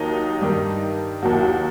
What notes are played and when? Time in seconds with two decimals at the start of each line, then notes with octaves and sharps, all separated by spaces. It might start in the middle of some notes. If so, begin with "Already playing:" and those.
Already playing: D#2 D#3 F#3 D#4
0.41 G2 D#3 G3
1.23 D#2 D#3 F#3 F#4
1.33 E4
1.43 F#4